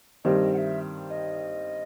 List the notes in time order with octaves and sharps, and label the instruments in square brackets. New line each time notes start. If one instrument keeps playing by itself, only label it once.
[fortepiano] G2 D#3 G3 C4 [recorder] D#5
[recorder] F#5
E5
D#5